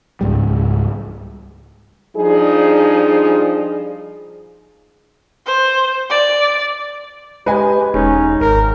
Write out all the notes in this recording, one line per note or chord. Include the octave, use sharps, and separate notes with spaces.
C#2 G#2 G3
F3 G3 D4 D#4 G#4
C5
D5
G#3 G4 B4 D#5 G#5
E1 G#3 C#4 D#4
G#1 A#4